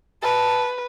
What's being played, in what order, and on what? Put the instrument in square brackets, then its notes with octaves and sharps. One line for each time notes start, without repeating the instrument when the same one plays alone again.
[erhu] B4 [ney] A5